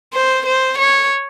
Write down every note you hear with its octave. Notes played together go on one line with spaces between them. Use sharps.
C5
C5
C#5